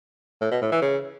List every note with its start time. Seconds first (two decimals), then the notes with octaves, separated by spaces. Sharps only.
0.41 A2
0.52 B2
0.62 A2
0.72 E3
0.82 C#3